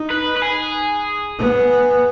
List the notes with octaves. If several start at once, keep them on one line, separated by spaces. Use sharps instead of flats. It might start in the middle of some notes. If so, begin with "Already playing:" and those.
Already playing: D#4
B4
B4
G#4
B3